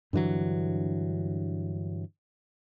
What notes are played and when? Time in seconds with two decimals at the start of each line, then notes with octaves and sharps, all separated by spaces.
0.13 G2 D3 E3 F#3